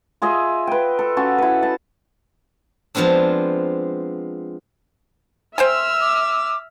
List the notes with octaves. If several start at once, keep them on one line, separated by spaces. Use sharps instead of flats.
F4 G#4 D#5 E5
B4 G5
A4
C#4 F#4 A5
E4 B4
A5
F3 G#3 B3 C4 D4
C5 E5 G5 G#5 C6 E6 F6
D6